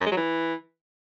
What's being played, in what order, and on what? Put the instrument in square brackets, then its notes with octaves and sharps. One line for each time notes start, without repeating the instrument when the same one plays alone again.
[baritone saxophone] F#2
G#3
F#3
E3